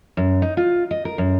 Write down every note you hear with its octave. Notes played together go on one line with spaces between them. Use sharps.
F#2
D#4
F4
D#5
A#4
F#2